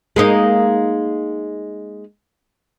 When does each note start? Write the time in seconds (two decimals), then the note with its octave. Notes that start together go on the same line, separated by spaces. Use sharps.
0.16 G#3 A#3 D#4